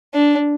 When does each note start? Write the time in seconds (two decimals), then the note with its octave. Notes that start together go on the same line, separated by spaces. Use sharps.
0.14 D4